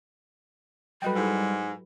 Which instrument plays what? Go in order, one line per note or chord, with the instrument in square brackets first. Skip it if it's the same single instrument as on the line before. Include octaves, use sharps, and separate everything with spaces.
[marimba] F#3 F#4 A4 [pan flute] G3 [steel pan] B4 D#5 G5
[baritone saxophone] G#2 [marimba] E4 G4 A4